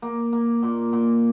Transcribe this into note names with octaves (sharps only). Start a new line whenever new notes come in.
A#3
A#3
A#2
A#2